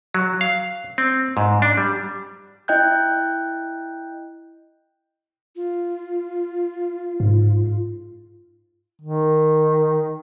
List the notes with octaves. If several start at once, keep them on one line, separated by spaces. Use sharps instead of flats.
F#3
F5
C4
G#2
D4
G3
E4 D#5 G5 F#6 G6
F4
G#2
D#3